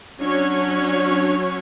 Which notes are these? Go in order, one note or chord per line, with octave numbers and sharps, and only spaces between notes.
F#3 C#4 D4 C#5